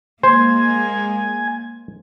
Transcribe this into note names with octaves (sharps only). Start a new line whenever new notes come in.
G#3 A#3 C5 G#5